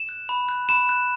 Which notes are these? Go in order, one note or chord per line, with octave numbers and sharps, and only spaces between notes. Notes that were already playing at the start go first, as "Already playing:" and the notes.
Already playing: E7
F#6
B5
F#6
B5 E7
F#6